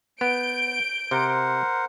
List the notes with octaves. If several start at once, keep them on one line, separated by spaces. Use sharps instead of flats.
B3 G6 D7
C3 A#4 C5 F#5